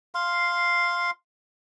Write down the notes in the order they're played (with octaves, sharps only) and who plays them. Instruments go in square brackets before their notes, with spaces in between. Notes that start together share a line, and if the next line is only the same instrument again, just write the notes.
[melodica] F5 C6